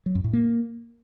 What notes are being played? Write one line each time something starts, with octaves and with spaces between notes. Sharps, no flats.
F#3
F#2
A2
A#3